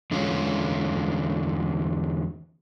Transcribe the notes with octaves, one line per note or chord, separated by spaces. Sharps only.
E2 D3 G#3 C#4 F4